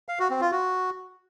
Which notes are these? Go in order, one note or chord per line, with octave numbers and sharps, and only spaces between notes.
F5
F#4
C4
F4
F#4